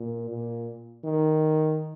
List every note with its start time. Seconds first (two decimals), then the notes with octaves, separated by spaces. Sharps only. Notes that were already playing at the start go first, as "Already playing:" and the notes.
Already playing: A#2
0.30 A#2
1.05 D#3